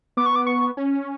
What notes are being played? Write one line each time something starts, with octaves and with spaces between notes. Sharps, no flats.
B3 D6
C#6
D6
C#6
C#4